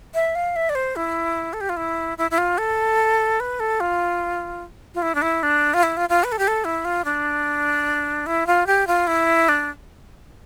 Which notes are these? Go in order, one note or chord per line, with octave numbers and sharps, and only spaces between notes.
E5
F5
E5
D5
C5
E4
A4
G4
F4
E4
E4
E4
F4
A4
B4
A4
F4
F4
E4
D4
E4
D4
F4
E4
F4
F4
B4
A4
G4
A4
E4
F4
D4
E4
F4
G4
F4
E4
D4